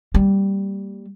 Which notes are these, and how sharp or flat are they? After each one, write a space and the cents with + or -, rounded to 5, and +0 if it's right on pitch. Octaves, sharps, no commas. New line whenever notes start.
G3 +0 A#3 -25